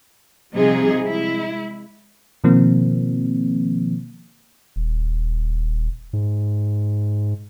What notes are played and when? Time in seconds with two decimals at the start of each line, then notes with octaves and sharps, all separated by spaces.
0.53 C3 F3 G3 C4 D#4 G#4
1.05 G#3 E4
2.44 B2 D#3 F3 A#3 C4
4.76 D#1
6.13 G#2